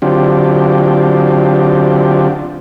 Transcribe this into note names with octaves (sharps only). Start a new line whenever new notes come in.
D3 F#3 C4 D4 F4 G4